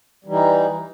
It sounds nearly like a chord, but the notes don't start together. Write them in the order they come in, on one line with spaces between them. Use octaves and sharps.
G3 E3 D#4